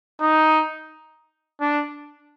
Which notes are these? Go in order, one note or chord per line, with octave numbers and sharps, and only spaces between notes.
D#4
D4